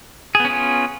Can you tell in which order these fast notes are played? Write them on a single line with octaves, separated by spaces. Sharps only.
G#4 B3 C#4 F4